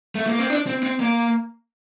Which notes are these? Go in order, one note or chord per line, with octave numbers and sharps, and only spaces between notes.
A3
A#3
C4
D4
C4
C4
A#3